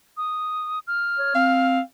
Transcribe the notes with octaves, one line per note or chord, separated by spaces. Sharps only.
D#6
F6
C#5
C4 F5